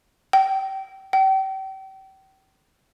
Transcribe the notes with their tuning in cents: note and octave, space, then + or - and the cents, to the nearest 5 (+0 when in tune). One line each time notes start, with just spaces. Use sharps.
G5 -25
G5 -35